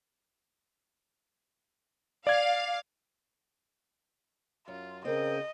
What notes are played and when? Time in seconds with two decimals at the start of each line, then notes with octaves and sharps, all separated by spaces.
2.27 D5 F5 G#6
4.68 F#2 F4
5.05 C#3 C4 A#4 D#5 G5